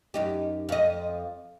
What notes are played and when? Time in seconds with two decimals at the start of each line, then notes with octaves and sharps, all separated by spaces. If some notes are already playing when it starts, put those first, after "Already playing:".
0.14 F#2 D#4 G4
0.69 F2 D#5